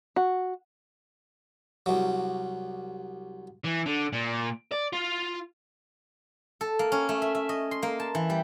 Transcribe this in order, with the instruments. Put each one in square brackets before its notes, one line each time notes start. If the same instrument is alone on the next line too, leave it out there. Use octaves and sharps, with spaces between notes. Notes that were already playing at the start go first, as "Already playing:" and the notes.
[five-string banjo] F#4
[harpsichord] C2 F#3
[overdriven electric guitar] E3
D3
A#2
D5
F4
[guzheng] A4
A#3
C#4
A3
E5
E5
D#5
C6
A#3
A5
E3
G3